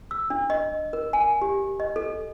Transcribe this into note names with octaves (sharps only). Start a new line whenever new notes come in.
E6
D4
D#5
A#4
G#5
G4
D#5
A4